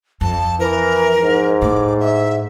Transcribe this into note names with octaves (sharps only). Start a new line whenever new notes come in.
F2 A5
E3 A#4
G#2
A2 D6
E5